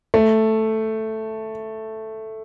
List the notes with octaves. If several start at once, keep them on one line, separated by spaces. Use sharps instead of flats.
A3